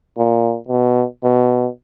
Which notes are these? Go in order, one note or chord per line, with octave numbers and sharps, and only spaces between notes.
A#2
B2
B2